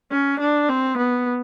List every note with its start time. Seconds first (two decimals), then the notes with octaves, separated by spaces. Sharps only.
0.12 C#4
0.40 D4
0.69 C4
0.98 B3